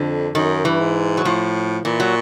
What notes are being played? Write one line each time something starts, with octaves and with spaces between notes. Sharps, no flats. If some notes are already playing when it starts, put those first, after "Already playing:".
Already playing: F2 D3
F#2 D#3
G2 E3
G#2
F#3
A2 F3
A#2 E3
F#3